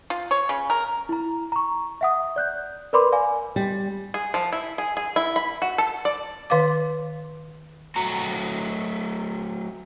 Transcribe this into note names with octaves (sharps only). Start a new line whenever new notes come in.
F4
C#5
C#3
A#4
E4 A#5
A#5 C#6
E5 F#5 D#6
D5 F#6 G6
A#4 B4 D5 B5 C6 D6
D5 F5 G#5
G3
G#4
F3
E4
G#4
G#4
E4
B5
F#4
A4
D5
D#3 B4 F5 D6
F#3 A3 F#4 A#5